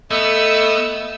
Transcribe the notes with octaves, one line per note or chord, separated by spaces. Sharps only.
A3 B3 D#5 E6